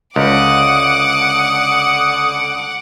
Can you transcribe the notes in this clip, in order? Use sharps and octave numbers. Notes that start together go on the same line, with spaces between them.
C#2 D3 F#5 D6 D#6